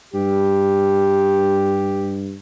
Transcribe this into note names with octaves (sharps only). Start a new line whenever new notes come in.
G2 G4